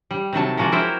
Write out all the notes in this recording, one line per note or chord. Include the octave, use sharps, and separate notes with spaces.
G3
C3 D#3 F#3 A5
F3 G#3 A#3 F#4
F#3 E4 A#4 C5 E5 G5